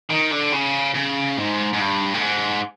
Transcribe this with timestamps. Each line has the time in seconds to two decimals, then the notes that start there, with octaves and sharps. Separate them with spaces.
0.10 D#3
0.32 D3
0.53 C#3
0.94 C#3
1.37 G#2
1.73 G#2
1.79 G2
2.14 A2
2.20 G#2